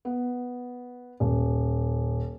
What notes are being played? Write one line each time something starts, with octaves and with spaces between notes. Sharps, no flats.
B3
D#1